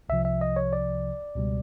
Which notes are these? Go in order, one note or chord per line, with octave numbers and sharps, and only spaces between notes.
C2 C3 F3 E5
E5
D#5
C#5
D5
C#2 B2 G3